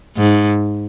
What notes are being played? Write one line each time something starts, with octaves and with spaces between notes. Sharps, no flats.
G#2